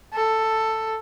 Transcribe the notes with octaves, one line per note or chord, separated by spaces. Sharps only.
A4